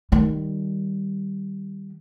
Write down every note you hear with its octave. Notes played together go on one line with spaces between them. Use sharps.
D#3 G3